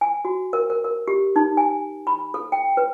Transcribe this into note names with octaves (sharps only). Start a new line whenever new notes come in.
G#5
F#4
A#4
A#4
A#4
G4
D#4
G#5
B5
A4
G5
B4